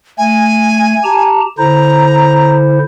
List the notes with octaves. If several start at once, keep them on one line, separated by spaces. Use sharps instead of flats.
A3 G#5
G4 A5 A#5
D3 E4 C5 A#5